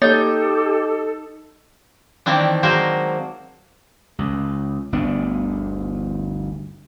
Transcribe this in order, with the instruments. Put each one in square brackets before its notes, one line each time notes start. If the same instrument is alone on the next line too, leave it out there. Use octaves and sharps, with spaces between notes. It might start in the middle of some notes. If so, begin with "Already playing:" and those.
[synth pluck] A#3 C#5 A6 [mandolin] D#4 G6 [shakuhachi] G4 [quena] A4
[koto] D#3 E3 A#3 C4 D4
F#3 G#3 A#3 A#4 C5
[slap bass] C#2
G1 D2 B3 D4